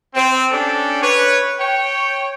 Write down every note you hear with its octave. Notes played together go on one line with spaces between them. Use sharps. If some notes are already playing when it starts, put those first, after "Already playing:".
C4
C#4 D4 G4 A4
B4 C#5
C#5 G5